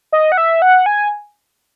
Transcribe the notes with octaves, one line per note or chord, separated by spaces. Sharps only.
D#5
F#5
E5
F#5
G#5